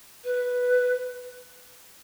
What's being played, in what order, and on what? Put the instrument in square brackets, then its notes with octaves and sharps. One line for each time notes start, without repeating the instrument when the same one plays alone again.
[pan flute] B4